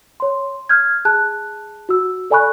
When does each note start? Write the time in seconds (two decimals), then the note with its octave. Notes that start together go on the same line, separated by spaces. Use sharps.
0.20 C#5 C6
0.69 F6 G6 G#6
1.05 G#4 A5 F#6
1.89 F#4 E6
2.30 A4 D5 G#5 B5 C#6 F#6